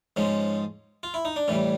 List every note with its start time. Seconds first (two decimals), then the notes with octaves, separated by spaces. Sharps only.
0.16 G#2 F3 G#3 C#4
1.03 F4
1.14 E4
1.25 D#4
1.36 D4
1.48 A2 E3 G3 C#4